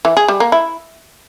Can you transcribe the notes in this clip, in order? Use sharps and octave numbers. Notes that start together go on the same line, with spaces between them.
E3
G#4
G3
A#3
E4